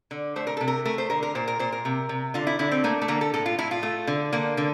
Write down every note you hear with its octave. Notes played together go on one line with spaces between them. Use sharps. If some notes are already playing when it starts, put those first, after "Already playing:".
D3
A3 C5
A#4
C3 A4
A#4
A3 A#4
C5
D3 A#4
A#4
A#2 C5
A#4
A#2 C5
A#4
C3
C3
D3 F4
E4
D3 E4
C4
A3 A#3
A3
D3 A#3
A4
A2 A4
F4
A2 E4
F4
A3
D3
D3 A#3
D3